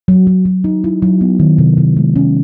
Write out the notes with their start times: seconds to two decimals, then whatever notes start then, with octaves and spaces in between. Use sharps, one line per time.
0.08 F#3
0.27 F#3
0.45 F#3
0.64 D#4
0.84 E4
1.02 F#3
1.21 B3
1.40 D#3
1.58 C3
1.77 C3
1.97 G#3
2.16 C#4